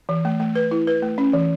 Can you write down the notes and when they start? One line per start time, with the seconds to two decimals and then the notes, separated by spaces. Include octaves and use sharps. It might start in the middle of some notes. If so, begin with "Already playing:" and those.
0.09 E3
0.25 A3
0.40 A3
0.55 B4
0.71 E4
0.87 B4
1.02 A3
1.18 C#4
1.33 E3